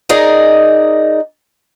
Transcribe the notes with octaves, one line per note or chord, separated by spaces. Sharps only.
D#4 G#4 A#4 D5 D#5